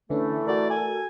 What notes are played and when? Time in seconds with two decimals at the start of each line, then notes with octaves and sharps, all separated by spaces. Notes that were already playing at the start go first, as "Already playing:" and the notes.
0.10 D3 E3 A3 C#4 D4 A4
0.47 F#4 A#4 D5
0.70 G#5